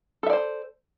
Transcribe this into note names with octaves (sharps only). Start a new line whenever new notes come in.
A4 C5 D5 E5